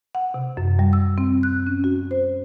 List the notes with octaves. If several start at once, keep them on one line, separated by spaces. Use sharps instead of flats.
F#5
C3
F#2
G3
E6
C4
F#6
C#4
F#4
C5